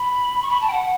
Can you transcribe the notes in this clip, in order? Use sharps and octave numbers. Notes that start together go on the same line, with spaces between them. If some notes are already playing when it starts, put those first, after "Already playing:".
Already playing: B5
C#6
B5
A5
G5
F#5